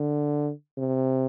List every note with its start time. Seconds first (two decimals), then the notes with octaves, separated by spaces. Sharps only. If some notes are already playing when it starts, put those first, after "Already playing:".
Already playing: D3
0.78 C3